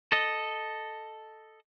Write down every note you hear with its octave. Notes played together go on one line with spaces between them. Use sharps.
A4 D#5